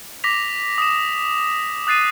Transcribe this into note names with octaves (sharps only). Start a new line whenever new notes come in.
D6 A#6 B6 F7
D#6 E7
D#6 F#6 A6 C7 D#7